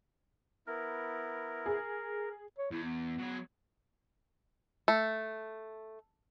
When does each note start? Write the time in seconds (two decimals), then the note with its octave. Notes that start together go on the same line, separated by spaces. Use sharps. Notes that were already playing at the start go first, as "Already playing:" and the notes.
0.67 B3 E4 A#4
1.66 G#4
2.58 C#5
2.71 E2 E4
2.84 B3
3.19 F#3 G#4
4.88 A3